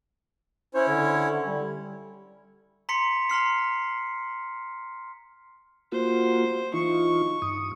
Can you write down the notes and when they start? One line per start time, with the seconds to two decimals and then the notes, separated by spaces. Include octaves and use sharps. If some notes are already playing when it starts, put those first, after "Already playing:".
0.75 C#4 E4 C5 C#5
0.88 D3
1.46 G3
2.89 A#5 C6 B6 C#7
3.30 A#5 C6 F6 C7
5.92 A#3 F4 F#4 C5
6.74 E3 D#4 F4 C#6
7.42 G2 D#6